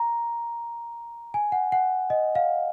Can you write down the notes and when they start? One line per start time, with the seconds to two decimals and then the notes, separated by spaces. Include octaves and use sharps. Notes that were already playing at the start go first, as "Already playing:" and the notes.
Already playing: A#5
1.34 G#5
1.52 F#5
1.72 F#5
2.10 D#5
2.35 F5